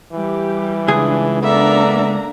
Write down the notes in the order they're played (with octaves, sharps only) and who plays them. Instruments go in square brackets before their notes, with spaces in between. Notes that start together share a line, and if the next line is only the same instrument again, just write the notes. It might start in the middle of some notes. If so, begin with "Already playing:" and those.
[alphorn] E3 [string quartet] G3 [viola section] G4
[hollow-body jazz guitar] C#2 G#4 [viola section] D4
[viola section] A#3 D4 A#5 [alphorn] B3 [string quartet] A4 D5 E5